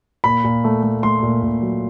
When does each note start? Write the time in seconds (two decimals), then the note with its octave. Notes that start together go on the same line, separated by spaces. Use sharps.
0.24 A#2 B5
0.44 A#2
0.64 A3
0.83 A3
1.03 A3 C6
1.23 A#2
1.43 A#2
1.62 F#3